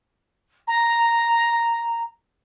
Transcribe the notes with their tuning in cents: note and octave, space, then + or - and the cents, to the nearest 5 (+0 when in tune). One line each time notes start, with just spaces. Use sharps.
A#5 -5